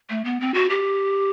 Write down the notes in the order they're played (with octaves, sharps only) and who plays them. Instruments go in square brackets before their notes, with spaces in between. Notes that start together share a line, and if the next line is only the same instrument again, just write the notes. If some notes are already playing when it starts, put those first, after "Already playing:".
[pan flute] A3
B3
C4
F#4
G4